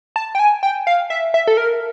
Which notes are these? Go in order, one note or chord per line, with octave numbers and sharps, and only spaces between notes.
A5
G5
G#5
G5
F5
E5
E5
A4
A#4